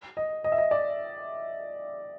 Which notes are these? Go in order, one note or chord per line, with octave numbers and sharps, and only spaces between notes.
D#5
D#5
E5
D#5
D5